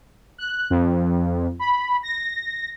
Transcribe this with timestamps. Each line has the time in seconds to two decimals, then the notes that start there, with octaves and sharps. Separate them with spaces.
0.38 F#6
0.70 F2
1.59 B5
2.03 A#6